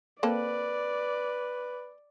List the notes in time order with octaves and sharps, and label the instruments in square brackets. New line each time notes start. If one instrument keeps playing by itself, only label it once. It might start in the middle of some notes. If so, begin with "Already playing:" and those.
[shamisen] A#3 C4 A4 [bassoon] B4 [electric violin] D5